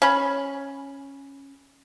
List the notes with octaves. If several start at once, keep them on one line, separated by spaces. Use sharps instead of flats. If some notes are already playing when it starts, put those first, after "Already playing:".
C#4 B5